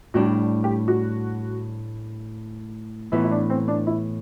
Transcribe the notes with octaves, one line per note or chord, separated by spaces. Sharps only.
A2 G3 D4 F#4
G4
F#4
A2 E3 B3 E4
E4
D4
C4
D4
E4